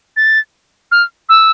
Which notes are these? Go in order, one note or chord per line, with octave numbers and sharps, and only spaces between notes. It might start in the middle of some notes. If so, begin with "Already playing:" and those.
A6
F6
E6